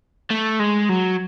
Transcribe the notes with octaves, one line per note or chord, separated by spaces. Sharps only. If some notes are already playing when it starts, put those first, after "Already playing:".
A3
G#3
F#3